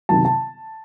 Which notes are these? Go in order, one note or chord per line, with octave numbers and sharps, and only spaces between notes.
C3 D#3 F#3 A5
A5